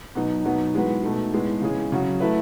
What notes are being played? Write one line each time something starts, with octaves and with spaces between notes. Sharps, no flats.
B2 F#3 B3 D#4
B2 F#3 B3 D#4
E3 G#3 B3 F#4 B4
B2 A3 D#4
A2 G#3 B3
C#3 E3 G#3 C#4 G#4
C#3 F#3 C#4 F#4
A3 E4 B4